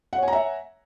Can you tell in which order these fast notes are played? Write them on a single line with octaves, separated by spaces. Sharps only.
F#5 C#5 G#5 A#5 E5